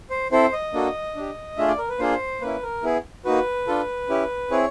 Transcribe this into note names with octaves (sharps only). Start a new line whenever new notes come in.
C5
C4 E4 A4 C5
D#5
A#3 D4 F#4 A4
D4 G4
A3 D4 F4 G#4 E5
D5
A#4
B4
A#3 D4 F4 G#4 C5
A#3 C#4 E4 B4
A#4
B3 E4 G#4
A#3 D#4 F#4 B4
D4 F4 A4
C#4 E4 G4
C4 E4 G#4 C#5